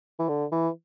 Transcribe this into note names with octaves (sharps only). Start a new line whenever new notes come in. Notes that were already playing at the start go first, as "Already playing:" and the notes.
E3
D3
E3